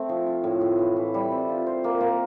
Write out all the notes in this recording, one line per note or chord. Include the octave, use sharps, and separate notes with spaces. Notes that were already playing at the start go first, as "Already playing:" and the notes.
Already playing: A3 C4
F3
F4
A2
A2
E3
E3
G3
C4
F4
C5
A#3
A#3